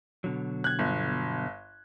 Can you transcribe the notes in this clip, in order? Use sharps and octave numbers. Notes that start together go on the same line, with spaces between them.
B2 D3 F#3
F#6 G#6
G1